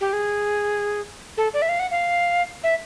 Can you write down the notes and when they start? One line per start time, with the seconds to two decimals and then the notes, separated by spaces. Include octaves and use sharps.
0.01 G4
0.13 G#4
1.37 A4
1.54 D5
1.62 E5
1.69 F5
1.80 F#5
1.91 F5
2.64 E5